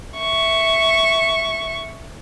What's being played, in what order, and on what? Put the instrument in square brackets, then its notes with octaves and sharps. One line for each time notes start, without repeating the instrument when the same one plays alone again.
[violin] E5 C#6